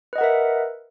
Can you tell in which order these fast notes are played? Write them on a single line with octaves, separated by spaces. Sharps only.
B4 D#5 F#5 A#4 E5